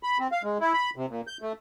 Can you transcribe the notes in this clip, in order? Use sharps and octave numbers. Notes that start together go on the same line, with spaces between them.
B5
C4
F5
G#3
E4
B5
C3
A#2
G6
A3